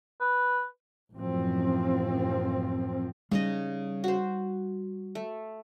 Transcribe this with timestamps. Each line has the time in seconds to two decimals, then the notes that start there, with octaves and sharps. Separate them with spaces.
0.21 B4
1.14 A1 F#2 F3 C4
3.31 C#3 G3 D#4 D#5
4.04 F#4 C5
5.15 A3